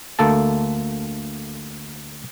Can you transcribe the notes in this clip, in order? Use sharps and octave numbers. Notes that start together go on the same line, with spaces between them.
D2 A3 A#3 A4 A5